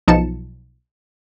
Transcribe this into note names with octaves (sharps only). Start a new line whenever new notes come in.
B1 F3 D#4 A5 C#7 E7